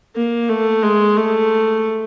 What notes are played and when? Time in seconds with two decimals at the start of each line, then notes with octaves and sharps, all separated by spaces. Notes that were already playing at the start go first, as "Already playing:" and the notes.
0.16 A#3
0.49 A3
0.83 G#3
1.17 A3